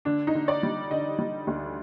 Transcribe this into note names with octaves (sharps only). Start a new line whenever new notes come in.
D3 D4
D#4
D3
D5
G3
D3 D#5
G3
D2